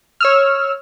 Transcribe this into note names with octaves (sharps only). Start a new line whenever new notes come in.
C#5 E6 F6